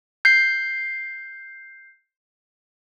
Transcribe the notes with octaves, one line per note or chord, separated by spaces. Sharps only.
G6 C7